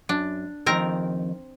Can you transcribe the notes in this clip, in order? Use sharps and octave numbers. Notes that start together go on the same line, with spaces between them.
F#2 D4
F2 G#2 D#3 C4 A#4 A#5